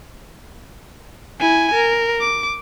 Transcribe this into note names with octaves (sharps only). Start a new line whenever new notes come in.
E4 G#5
A#4
D6